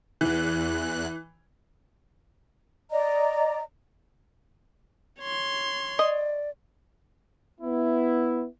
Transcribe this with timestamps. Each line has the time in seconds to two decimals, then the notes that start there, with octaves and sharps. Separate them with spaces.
0.21 E2 E3 F#6
2.92 D5 D#5 A#5
5.20 C#5 C6
5.99 D5 D#5
7.61 B3 E4